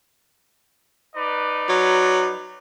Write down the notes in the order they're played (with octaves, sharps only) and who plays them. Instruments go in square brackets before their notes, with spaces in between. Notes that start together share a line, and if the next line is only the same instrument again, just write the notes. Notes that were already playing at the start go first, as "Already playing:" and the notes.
[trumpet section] D#4 B4 D5
[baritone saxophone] F#3